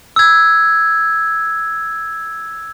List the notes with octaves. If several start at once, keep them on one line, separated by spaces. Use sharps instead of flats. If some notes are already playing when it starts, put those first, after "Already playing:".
E6 G#6